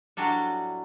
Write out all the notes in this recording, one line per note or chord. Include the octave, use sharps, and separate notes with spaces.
A2 F#3 G3 D4 F#4